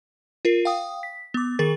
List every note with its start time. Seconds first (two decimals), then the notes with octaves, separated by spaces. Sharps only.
0.45 F4 A#4 C7
0.65 F5 G5 D#6
1.03 B6
1.34 B3 D6
1.59 D#3 G#4 A#4 A6